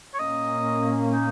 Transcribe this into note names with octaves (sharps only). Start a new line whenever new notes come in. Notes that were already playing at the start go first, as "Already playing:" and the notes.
C#5
A#2 A#3 C#4 D#5
D#4